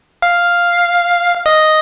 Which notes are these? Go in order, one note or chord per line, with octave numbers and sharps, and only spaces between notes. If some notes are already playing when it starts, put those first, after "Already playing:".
F5
D#5